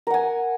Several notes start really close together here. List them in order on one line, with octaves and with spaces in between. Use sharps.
A#4 F#5 G#5